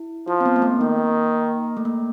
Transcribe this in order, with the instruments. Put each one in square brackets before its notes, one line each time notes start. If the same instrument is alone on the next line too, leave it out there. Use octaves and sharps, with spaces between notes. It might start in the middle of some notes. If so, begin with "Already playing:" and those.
Already playing: [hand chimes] E4
[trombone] F3 [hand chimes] F4
[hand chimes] C4
B3
A#3
A3
[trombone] D#3 [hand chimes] A#3
[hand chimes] A3
A#3